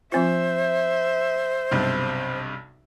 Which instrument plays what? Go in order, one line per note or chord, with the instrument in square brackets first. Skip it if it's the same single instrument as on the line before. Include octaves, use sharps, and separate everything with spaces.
[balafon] F3 C4 F4 [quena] C5 [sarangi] E5
[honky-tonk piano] B1 G2 C3